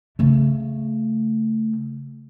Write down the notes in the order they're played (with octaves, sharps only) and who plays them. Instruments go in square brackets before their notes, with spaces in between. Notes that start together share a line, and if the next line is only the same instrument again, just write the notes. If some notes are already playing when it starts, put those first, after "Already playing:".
[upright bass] C#3 A3